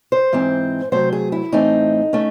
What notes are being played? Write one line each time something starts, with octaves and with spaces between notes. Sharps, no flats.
C5
G#2 E3 C4
C3 F#3 A3 C5
G#4
E4
A2 E3 A3 C4 D#4
A3 C#4